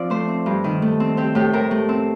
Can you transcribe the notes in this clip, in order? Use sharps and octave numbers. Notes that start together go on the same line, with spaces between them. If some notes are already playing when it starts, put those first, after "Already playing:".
Already playing: F3 C4 D5
A3 C5
C4
G2
D#3
A3
C4
C4 G4
A2 G4
A2 A#4
A3
C4